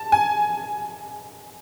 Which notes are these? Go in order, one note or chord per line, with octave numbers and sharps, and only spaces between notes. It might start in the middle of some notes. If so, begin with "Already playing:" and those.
Already playing: A5
G#5